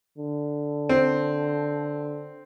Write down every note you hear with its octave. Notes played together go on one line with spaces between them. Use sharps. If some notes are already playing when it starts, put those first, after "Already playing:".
D3
C4